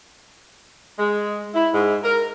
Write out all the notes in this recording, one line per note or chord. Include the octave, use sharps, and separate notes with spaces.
G#3
E4
G#2
A#4